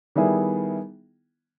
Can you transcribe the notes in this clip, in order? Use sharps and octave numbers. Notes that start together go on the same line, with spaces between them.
D#3 G3 B3 E4 G#4